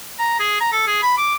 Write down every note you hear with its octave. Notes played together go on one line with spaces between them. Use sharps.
A#5
G#4
A#5
A4
G#4
B5
D6